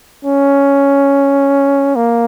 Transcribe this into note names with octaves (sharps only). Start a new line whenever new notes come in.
C#4
A#3